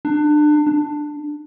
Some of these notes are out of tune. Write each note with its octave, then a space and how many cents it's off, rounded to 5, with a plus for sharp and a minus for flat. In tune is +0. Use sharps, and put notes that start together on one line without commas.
D4 +30
D4 +15